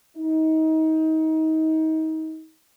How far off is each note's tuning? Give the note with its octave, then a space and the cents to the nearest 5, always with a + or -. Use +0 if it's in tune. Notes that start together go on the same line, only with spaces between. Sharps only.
D#4 +30